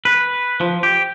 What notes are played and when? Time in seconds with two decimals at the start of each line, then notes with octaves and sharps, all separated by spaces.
0.05 B4
0.61 F3
0.83 G4